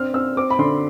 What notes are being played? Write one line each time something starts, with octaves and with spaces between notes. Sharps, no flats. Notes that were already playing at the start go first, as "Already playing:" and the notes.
Already playing: C4 D4 F6
C4 E6
C4 D6
B5
D3 C6